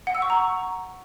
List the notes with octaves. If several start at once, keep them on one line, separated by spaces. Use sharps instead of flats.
F#5
E6
C#6
A#5